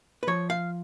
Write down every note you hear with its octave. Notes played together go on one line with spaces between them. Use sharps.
B4
F3 C#5
F5